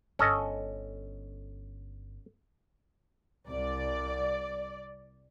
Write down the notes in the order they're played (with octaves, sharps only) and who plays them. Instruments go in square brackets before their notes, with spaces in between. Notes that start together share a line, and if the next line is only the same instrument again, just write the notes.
[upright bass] G1 [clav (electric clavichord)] C#4 A4 D#5
[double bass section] C2 [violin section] D5